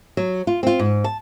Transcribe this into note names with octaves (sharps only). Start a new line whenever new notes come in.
F#3
F4
C4 F4
G#2
A5